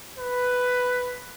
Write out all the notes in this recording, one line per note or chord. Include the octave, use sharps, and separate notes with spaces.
B4